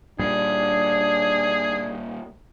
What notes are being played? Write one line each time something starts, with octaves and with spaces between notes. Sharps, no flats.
A#2 G3 D4 G#4